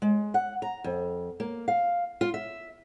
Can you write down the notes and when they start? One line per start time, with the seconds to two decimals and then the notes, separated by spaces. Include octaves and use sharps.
0.02 G#3
0.34 F#5
0.62 A#5
0.84 F2
1.40 A#3
1.68 F5
2.21 F4
2.34 E5